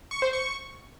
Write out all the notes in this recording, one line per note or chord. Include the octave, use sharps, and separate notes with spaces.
C#6
C5
C#6